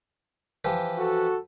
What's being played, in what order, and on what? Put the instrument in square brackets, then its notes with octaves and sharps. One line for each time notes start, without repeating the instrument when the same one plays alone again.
[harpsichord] E3 F3 G4
[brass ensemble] F#4 A4